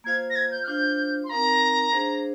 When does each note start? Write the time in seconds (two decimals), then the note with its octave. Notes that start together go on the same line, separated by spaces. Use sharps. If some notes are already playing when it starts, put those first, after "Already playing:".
0.04 A#3 F4 C5 F5 G#6
0.30 A#6
0.36 G#6
0.51 G6
0.64 F6
0.67 D4 F4 C5 F5 G6
1.24 C6
1.30 C4 D#4 A#4 F5 A#5
1.92 D4 G#4 C5 F5